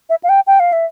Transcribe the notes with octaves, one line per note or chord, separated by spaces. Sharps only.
E5
F5
G5
G5
F5
E5